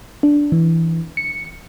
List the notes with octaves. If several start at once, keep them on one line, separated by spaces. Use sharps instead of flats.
D4
E3
C#7